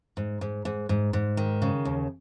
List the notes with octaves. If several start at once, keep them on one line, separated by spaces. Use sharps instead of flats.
G#2
G#2
G#2
G#2
G#2
D#3
C#3
D#2